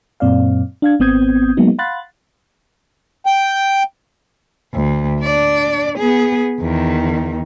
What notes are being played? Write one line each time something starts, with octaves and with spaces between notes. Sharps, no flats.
F#2 A#2 C4 D5 F5
D4 F5 G#6
G#1 B3 C4 D#6 G6 G#6
F#3 G#3 A#3 B3 D#4
F5 F#5 B5 C6 F#6 A6
G5
D2
D4 D5
B3 G#4
E2 D#3